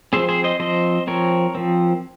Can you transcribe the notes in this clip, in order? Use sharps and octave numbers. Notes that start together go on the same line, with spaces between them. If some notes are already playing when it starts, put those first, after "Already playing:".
F3 C4 G#4 C5
G#4 C5
C5 D#5
F3 C4 C5 D#5
F3 C4 A#4 C#5
F3 C4